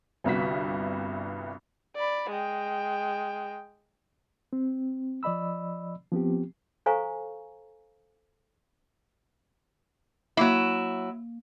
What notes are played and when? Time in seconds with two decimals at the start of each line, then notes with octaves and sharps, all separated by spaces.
0.24 G1 C2 G2 F#4 B6
1.96 D5 B5
2.31 G#3 G5
4.53 C4
5.23 F3 D5 D#5 B5 E6
6.12 F3 B3 C4 G4
6.86 A4 C5 F5 G#5 A#5 C#6
10.37 F#3 A#3 E4